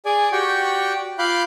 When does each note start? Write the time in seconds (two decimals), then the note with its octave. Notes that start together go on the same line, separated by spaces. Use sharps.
0.05 G#4 D5 G#5
0.32 F#4 G4 D5 G5 C#6
1.19 F4 F5 B5 D6 F#6 G6